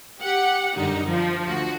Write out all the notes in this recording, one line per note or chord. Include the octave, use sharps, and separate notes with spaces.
G4 F#5
F#2 D3 G3 D#4
F3
D2 F#4